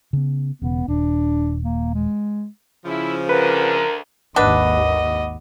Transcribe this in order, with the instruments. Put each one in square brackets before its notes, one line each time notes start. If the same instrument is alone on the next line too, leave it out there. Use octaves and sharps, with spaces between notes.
[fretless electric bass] C#3 B3
[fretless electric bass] E1 C#3 [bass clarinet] B3
[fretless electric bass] D#1 [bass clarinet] D4
[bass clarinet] A#3
G#3
[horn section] C#3 F3 [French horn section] E4
[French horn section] D2 D3 [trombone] A#4 [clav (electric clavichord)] B4
[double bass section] G#1 D#2 [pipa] D4 B4 [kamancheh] D#5 [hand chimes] F#5 B5 D6